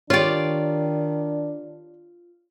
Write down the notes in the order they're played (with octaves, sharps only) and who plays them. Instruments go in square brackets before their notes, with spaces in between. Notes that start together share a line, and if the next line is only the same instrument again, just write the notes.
[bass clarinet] D#3 [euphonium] D4 [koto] F4 D5 [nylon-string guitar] G4 C#5